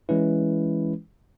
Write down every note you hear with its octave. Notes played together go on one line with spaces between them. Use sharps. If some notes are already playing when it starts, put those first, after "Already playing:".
E3 G#3 C#4 E4 B4